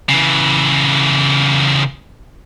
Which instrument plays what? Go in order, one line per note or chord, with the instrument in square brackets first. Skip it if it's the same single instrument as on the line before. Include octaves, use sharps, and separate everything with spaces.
[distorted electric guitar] C#3 E3